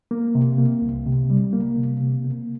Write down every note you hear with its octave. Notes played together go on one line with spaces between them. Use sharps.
A#3
C3
A#3
C2
C3
G3
A#3
C3
C3
A#3